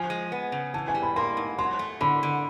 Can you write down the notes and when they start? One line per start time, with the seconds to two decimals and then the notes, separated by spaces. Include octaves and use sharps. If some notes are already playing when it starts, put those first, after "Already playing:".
Already playing: F3 G#5
0.10 G#3
0.32 B3
0.52 C#3
0.74 E3 A5
0.88 G#5
0.95 G3
1.02 B5
1.16 A#3 C6
1.37 G#2
1.59 F#3 C6
1.79 A3
2.01 D3 B5
2.23 D3